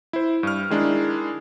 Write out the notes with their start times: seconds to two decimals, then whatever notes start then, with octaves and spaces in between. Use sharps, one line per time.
0.13 E4 C5
0.43 G2 F6
0.70 D#3 G#3 D4 E4